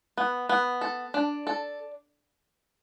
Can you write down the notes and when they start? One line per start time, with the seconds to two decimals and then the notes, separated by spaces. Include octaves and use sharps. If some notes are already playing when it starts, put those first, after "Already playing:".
0.17 B3
0.49 B3
0.81 A4
1.14 D4
1.47 A4